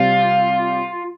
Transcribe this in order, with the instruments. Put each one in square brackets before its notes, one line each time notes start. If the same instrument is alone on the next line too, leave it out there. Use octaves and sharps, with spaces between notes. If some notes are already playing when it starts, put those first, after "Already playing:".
Already playing: [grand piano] C3 G3 C4 G4 [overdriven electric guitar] F4